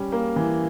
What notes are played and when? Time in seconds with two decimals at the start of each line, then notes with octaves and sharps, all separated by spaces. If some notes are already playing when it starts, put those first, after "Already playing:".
Already playing: G3 C#4
0.12 A#3
0.36 E3